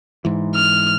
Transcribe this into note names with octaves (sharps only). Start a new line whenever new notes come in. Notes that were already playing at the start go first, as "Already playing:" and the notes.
G#2 E3
F6